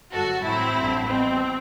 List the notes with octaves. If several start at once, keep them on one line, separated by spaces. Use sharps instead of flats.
G1 G2 F#3 F#4 A4
A1 A2 F#3 C4 E4
A1 G2 D3 F#3
E2 B2 G3 C4